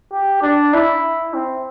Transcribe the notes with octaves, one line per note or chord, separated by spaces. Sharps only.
G4
D4
E4
C4